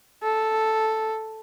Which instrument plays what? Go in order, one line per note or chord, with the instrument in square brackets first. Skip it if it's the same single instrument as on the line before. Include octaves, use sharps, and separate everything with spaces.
[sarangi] A4